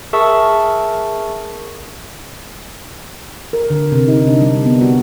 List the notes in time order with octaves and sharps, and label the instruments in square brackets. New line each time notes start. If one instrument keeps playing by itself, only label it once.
[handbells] G#4 A#4 E5 A5 C#6 E6
[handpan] A#4
D3
C3
D#4
D4
G3
B3
F#4